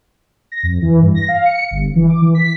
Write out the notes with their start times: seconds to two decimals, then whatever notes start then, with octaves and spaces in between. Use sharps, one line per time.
0.52 A#6
0.63 F2
0.82 E3
1.02 G2
1.15 A#6
1.28 F5
1.45 C#7
1.71 G1
1.96 E3
2.09 D6
2.22 E3
2.35 B6